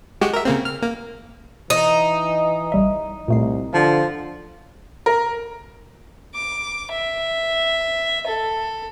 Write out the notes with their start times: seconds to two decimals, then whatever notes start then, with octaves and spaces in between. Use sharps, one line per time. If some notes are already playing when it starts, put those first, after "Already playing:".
0.21 G#3 F#4 G4
0.33 A#4 E5
0.45 C#3 A#3 C4
0.65 F6
0.82 A#3
1.70 E3 D#4
2.72 A1 G3 E5
3.28 C2 A#2 A3 C7
3.74 D3 F3 A5
5.06 A#4
6.34 D6
6.91 E5
8.26 A4